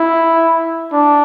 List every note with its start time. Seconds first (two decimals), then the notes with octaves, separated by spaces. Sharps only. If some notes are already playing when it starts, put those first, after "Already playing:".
Already playing: E4
0.92 D4